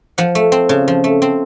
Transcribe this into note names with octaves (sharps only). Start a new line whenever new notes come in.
F3 F#5
A3
C4
C#3
F3
A3
C4